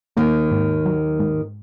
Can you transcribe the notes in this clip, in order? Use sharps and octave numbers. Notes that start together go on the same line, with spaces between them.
D#2 D#3 A#3
G#2
F#3
G#2